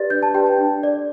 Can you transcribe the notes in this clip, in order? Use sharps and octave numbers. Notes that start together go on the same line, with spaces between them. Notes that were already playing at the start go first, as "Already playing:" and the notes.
Already playing: G4 B4 D5 A6
D4 G6
A5
G4 B4 D5 G5
A5
D4
A4 D5